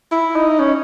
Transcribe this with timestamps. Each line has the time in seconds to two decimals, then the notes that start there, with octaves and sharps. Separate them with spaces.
0.12 E4
0.36 D#4
0.60 C#4